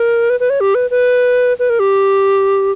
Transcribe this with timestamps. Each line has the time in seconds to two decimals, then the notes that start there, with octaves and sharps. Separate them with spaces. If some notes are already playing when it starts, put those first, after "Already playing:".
Already playing: A#4
0.30 B4
0.40 B4
0.50 C#5
0.61 G4
0.75 B4
0.90 B4
1.59 B4
1.70 A#4
1.80 G4